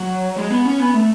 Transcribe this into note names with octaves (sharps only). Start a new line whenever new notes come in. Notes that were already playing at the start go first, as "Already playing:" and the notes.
Already playing: F#3
G#3
B3
C#4
B3
A3